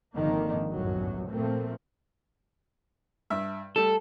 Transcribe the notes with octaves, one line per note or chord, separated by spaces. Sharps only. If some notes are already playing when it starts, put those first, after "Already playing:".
G#1 D3 D#3 F3 A#3
G1 C2 F#2 A2 F#3
A#2 F3 A3 A#3 C4
G2 E5
G3 A3 A4